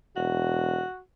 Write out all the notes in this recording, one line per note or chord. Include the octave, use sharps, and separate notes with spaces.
E1 F#4